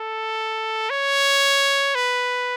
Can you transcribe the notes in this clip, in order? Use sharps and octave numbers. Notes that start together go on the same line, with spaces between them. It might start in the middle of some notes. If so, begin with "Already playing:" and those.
Already playing: A4
C#5
B4